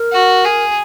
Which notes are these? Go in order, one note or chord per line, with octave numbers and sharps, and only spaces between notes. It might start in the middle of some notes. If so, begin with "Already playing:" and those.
Already playing: A#4
F#4
G#4